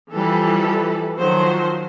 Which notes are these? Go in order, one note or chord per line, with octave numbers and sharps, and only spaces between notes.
E3 F3 G3 A4 B4 B5
D#3 F3 F#3 F#4 C5